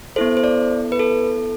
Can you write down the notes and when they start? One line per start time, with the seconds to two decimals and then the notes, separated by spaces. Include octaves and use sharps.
0.16 B3 E4 A4 C5
0.37 C5
0.44 D5
0.92 B4
0.99 A4